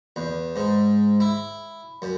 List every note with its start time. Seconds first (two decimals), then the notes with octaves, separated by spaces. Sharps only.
0.16 E2
0.56 G#2
1.20 E4
2.02 F#2